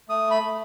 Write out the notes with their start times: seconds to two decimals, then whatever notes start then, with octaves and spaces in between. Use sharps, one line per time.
0.08 A3 D#6
0.31 B5
0.42 A3